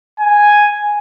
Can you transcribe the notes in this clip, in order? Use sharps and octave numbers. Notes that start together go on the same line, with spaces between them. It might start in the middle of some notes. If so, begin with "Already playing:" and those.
G#5